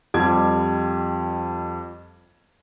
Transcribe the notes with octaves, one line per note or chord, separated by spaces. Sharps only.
F2 F3 G3 G4 D6 G#6